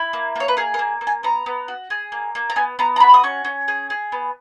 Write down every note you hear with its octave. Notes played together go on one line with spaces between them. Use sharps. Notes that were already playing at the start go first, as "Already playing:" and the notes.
Already playing: E4
A#3
A#3 C#5
B4
G#4 A#4
A#4
A#3
A#3
G#5
B3 A#5
B3
F#4
G#4
A#3
A#3
A#5
B3 G#5
B3 A#5
A#5
F#4 B5
D#6
C#4 C#6
C#4
G#4
G#4
B3